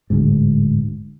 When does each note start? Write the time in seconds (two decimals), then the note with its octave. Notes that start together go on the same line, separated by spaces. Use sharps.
0.10 D1 D2 G#2